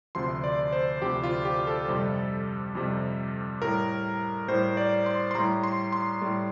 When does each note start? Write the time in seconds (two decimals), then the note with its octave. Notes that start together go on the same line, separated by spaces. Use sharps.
0.15 D2 C3 F3 C6
0.44 D5
0.72 C5
1.01 D2 C3 F3 G4
1.24 F4
1.45 G4
1.67 A4
1.88 F2 C3 G3
2.75 F2 C3 G3
3.62 A2 G3 A#4
4.48 A2 G3 C5
4.77 D5
5.06 C6
5.31 C6
5.35 A2 G3 A#5
5.64 C6
5.93 C6
6.21 A2 G3